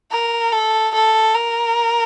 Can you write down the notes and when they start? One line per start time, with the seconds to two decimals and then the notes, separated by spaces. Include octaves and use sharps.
0.11 A#4
0.52 A4
0.94 A4
1.35 A#4